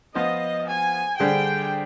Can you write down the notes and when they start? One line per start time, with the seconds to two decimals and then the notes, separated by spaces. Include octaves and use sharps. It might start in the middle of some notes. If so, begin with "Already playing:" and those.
0.15 F3 B3 F4 C5 D#5
0.68 G#5
1.20 D3 G3 D4 G#4 C5 G5